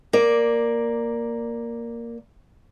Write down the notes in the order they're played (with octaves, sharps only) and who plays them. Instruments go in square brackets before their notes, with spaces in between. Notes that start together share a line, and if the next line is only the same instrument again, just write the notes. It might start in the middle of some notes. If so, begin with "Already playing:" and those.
[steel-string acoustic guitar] A#3 D5